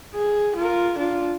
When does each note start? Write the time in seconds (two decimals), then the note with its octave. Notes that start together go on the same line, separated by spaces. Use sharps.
0.14 G#4
0.56 F4 A#4
0.98 D4 F4